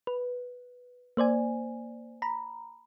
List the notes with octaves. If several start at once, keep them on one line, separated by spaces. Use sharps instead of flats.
B4
A#3 C5 D5 G#5
A#5 B5